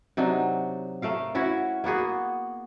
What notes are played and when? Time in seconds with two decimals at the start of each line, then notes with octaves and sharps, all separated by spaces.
0.17 C3 F#3 D4 D#4
1.02 A3 A#4 F5
1.35 C#4 E4 F#4 C#5
1.84 A#3 B3 F#4 G#4